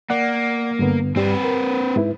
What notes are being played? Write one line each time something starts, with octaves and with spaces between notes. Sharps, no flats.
A#3 D5 F#5
G2 D3 B3
G2 G3 C4 B4
A#4
G#2 E4 B4